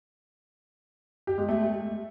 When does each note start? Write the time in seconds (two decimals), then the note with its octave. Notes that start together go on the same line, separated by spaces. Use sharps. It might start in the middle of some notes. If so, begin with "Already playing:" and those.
1.27 G4
1.38 G#3
1.48 A3